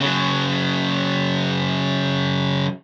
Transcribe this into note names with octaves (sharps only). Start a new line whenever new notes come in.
C#3 F#3